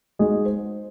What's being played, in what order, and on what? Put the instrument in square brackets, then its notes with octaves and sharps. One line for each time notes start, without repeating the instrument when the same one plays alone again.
[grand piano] G#3 D#4 F#4 G#4 D#5
C5